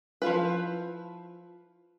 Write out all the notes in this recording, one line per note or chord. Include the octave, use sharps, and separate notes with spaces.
F3 E4 F4 B4